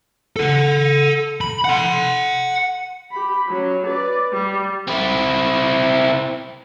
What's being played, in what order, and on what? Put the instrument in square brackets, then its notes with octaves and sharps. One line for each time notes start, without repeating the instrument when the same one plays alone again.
[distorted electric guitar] A4 F#5
B5
F#5 C6
[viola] G4 B5
F#3 C#4
B4 D5
G3
[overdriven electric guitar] C4 E4